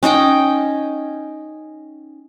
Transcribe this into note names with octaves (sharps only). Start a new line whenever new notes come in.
C#4 D#4 D#5 G5